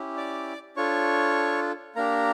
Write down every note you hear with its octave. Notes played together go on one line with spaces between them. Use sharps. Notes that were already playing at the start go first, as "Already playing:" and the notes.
Already playing: C#4 E4 G4
D5 D6
D4 F4 A4 C#5 C#6
A#3 D4 G4 A#4 A#5